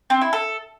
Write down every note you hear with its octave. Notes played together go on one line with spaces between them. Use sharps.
C4
E4
A4